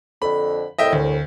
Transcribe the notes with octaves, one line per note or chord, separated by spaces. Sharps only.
F2 D3 B5
C2 A2 D#5 E5 G5
D2